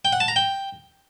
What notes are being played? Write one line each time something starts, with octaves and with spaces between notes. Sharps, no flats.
G5
F#5
A5
A#5
G5